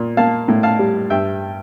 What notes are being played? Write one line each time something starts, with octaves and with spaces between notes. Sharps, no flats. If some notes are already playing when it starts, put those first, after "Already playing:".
Already playing: A#2
A#3 F5 A5
A2
F5 A5
G3
G2 E5 G5